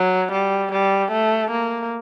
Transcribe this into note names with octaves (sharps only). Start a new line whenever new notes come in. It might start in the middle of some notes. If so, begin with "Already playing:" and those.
Already playing: F#3
G3
G3
A3
A#3